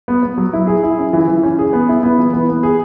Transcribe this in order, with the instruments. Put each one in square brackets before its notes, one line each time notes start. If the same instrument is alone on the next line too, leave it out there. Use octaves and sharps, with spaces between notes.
[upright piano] B3
B3
F#3
E4
G#4
E4
C#4
E3
E3
C#4
G#4
B3
E4
B3
E3
B3
B3
G#4